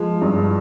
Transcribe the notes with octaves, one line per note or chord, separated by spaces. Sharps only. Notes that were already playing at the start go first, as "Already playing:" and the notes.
Already playing: F3 G#3
G2